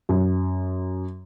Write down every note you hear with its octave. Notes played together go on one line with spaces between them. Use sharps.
F#2